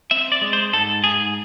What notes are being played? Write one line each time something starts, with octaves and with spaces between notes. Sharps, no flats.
C4 E5
D5
G#3
C5
G#2 A4
G#2 G#4